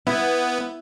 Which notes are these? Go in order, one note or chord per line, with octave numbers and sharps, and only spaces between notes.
B3 E4